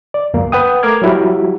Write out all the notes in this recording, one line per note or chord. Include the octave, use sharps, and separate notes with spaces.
D5
C#2 F#2 A#3
B4 F#5 G5 D#6
A3 A#4 D6 F6 G#6
F#3 G3 E4 F#4 G4